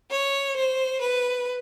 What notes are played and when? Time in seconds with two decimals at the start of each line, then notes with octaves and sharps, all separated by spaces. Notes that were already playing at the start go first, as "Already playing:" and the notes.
0.11 C#5
0.56 C5
1.01 B4